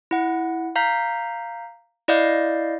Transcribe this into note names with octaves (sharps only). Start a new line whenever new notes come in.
E4 F#5
F5 A#5 G6 B6
E4 D5 D#5 F5 G6